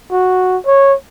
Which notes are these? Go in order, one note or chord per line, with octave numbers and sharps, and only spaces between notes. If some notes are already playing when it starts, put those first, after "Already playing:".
F#4
C#5